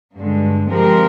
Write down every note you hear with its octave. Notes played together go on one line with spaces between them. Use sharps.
G2 D3 G#3
F3 G#3 C4 G4 A#4